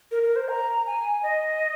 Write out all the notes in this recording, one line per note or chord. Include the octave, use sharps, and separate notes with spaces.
A#4
A#4
C5
A#5
G#5
D#5